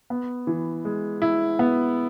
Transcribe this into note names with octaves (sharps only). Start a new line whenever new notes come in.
B3
E3
G#3
E4
B3